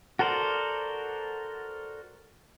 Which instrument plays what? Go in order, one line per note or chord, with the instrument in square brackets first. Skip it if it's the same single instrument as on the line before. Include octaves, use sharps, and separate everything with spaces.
[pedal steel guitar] F#4 A4 A#4 C5 D5